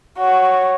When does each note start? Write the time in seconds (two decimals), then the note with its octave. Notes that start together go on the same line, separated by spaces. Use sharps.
0.19 F#4 C#5